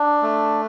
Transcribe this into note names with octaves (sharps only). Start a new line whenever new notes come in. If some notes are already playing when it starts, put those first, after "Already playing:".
Already playing: D4
A3